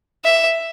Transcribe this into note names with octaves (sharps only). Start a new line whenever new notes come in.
E5